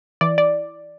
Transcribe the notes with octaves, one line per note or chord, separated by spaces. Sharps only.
E3 D5
D5